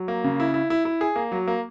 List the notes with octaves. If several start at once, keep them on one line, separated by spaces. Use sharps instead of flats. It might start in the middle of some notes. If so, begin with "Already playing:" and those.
Already playing: F#3
A#3
C#3
E4
E4
E4
E4
G#4
A#3
F#3
A#3